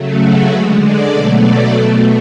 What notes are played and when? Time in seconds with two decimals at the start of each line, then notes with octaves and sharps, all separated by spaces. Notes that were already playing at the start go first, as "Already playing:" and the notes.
Already playing: C#3 F#3 A3
0.19 F#4
0.49 D3 G#3 B4
0.79 D5
1.10 B2 F#3 A3 D5
1.41 D5
1.71 B2 A3 A4